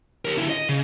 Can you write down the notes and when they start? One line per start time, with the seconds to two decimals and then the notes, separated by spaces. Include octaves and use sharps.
0.25 G4 A#4
0.38 D3 E4
0.50 D#5
0.69 C#3